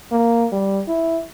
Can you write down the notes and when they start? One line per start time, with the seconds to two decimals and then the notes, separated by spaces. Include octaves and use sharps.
0.11 A#3
0.52 G3
0.88 E4